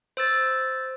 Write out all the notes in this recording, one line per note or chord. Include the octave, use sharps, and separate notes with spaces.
C5 E6 A6